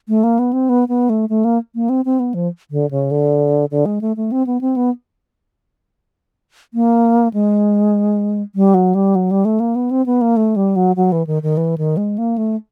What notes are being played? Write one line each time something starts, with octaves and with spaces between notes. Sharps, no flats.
A3
A#3
B3
C4
B3
B3
A3
A3
A#3
A#3
C4
C4
B3
F3
D3
C#3
D3
D3
G#3
A3
A3
C4
B3
C4
B3
A#3
G#3
G3
F#3
G3
F#3
G3
A3
A#3
B3
C4
B3
A#3
A3
G3
F#3
F#3
E3
D#3
D#3
E3
D#3
G#3
A#3
A3